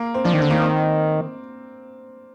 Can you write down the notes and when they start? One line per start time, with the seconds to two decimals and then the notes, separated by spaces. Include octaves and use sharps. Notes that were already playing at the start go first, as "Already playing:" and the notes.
Already playing: A#3
0.14 C4
0.25 F3 D4
0.33 D#3
0.38 D3 C4
0.50 D#3 A#3
0.62 C4